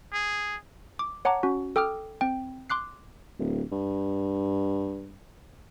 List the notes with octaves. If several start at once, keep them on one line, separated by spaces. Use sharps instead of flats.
G#4
D6
C#5 F#5 A5 A#5 D6
C#4 F#4
A4 G5 D6 D#6 F6
C4 G5
C6 D6 F#6 C7
D1
G2